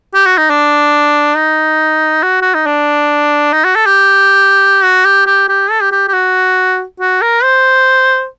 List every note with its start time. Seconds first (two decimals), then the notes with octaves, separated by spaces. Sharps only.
0.14 G4
0.26 F#4
0.38 D#4
0.50 D4
1.36 D#4
2.23 F#4
2.42 F#4
2.55 D#4
2.66 D4
3.53 D#4
3.64 F#4
3.75 A4
3.86 G4
4.83 F#4
5.05 G4
5.26 G4
5.48 G4
5.71 A4
5.81 G4
5.92 G4
6.08 G4
6.14 F#4
7.00 F#4
7.22 A#4
7.43 C5